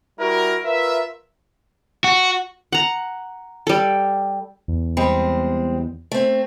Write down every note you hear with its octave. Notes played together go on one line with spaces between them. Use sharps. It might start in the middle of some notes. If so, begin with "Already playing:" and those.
G3 E4 F#4 A#4
F4 A#4 B4 E5
F#4
F#5 A#5
G3 A4
E2
G3 G#3 C4
A3 C4